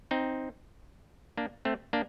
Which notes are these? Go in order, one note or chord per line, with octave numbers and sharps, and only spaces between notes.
C4 D#4
A#3 D4
A3 C4
A#3 D4